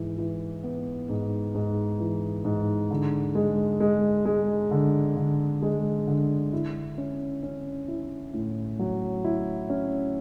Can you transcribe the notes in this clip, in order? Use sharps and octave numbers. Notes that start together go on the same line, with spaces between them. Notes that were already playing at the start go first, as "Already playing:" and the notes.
Already playing: G#2 E3
E3
B3
G#2
G#2
E3
G#2
D3
G#3
G#3
G#3
D3
D3
G#3
D3
E4
C#4
C#4
E4
A2
F#3
E4
C#4